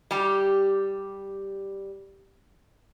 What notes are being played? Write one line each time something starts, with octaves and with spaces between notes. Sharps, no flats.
G3 G4